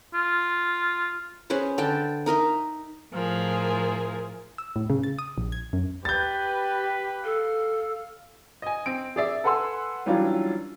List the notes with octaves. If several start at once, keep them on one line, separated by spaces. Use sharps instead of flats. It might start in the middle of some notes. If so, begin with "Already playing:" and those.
F4
C#4 G#4 B4 C5
D3 G5 A5
D#4 A#4 D#5 E5
A2 F3 G#4 A#4
E6
A2
C#3
A6
D#6
A#1
G#6
F#2
G4 B4 G6 A6
A4 F5
D#5 G#5
C4 D7
G#4 D5 E5
A4 B4 F#5 G#5 C6 E6
E3 F#3 G3 C#4 D4 F4